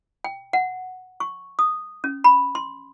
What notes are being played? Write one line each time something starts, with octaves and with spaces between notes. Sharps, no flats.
G5
F#5
C#6
D#6
C#4
B5
C6